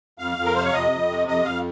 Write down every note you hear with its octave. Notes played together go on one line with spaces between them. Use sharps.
F2 F5
F2
A#4
C3 C5
C#5
F2 D#5
F2
C3
F2 D#5
F2 F5